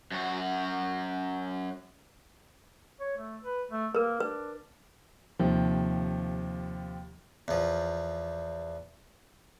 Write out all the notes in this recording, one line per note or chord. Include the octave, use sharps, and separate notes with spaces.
F#2 F#4
C#5
A3
B4
A3
A#3 A#4 B4
D4 B4
D#2 C3 F3
E2 F3